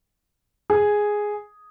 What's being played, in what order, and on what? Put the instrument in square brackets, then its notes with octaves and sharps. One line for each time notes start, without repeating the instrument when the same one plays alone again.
[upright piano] G#4